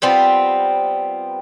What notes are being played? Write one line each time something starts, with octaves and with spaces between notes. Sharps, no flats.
G3 B3 C4 F4